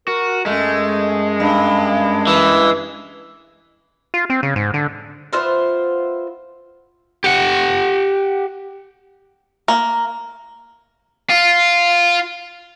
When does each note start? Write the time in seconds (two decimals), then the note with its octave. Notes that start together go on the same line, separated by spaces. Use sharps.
0.08 F#4 A#4
0.46 F#2 G#3 A3
1.40 G2
2.27 E3
4.14 F4
4.30 C4
4.43 C#3
4.56 G#2
4.74 D3
5.33 B3 F4 C5 E5
7.24 G4 F#5
9.68 A#3
11.30 F4